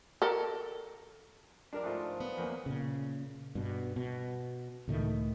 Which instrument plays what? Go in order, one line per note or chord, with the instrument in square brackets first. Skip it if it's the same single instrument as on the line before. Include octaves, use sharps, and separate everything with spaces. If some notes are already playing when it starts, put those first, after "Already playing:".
[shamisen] A4 A#4
[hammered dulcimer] F3 G3 [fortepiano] D4 A#4 D5
[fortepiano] G#2 A3 F4
[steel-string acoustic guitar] B3
[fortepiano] E2 A#3 [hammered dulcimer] C#4 G#4
[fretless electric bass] A#2 C#3
G2 B2
B2
C#2 A2 D#3 A3